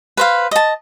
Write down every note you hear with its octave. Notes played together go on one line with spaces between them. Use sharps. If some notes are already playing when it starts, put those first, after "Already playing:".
B4 C5 F5
D#5 A5